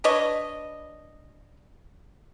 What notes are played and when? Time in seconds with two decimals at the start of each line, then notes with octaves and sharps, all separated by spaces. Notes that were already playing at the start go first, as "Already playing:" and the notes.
0.04 D4 B4 C#5 D#5